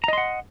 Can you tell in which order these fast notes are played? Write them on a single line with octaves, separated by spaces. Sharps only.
A#5 D#5 C6 F#5